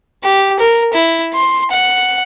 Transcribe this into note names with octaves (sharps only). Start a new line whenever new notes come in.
G4
A#4
E4
C6
F#5